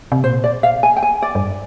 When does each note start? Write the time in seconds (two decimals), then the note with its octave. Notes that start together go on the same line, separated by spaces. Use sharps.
0.12 C3
0.23 A#2 C5
0.44 D5
0.63 F5
0.83 G#5
0.96 G5
1.03 G#5
1.22 D5
1.35 G2